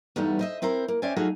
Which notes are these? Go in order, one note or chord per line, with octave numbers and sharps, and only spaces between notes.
E2 G2 G3 A3 B3 D#4
C5 D#5 E5
C4 E4 A#4 C5
A#3
C#4 C5 D5 E5 G5 G#5
F#3 A3 D#4 F4 F#4 G#4